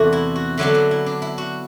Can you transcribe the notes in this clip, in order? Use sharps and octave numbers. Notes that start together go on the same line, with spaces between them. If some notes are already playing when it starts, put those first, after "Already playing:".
Already playing: E2 C3 E3 A3 D4 F#4
E4
F#4
D3 F#3 B3 D4 E4
D4
E4
D4
E4
F#4